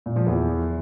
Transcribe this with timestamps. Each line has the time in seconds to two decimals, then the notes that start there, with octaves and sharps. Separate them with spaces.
0.06 A#2
0.16 F3
0.26 E2